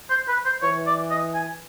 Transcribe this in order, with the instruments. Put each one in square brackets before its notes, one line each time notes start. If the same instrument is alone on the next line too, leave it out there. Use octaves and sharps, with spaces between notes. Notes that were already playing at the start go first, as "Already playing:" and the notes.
[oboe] C5
B4
C5
[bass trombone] E3 [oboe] C#5
[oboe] D5
D#5
G#5